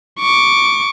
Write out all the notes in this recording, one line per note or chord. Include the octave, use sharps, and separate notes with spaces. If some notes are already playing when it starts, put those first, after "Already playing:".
C#6 D6